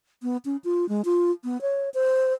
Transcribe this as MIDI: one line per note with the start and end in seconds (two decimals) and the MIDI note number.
0.23 0.37 59
0.45 0.57 61
0.64 0.88 65
0.89 1.02 56
1.05 1.31 65
1.44 1.61 59
1.61 1.89 73
1.94 2.33 72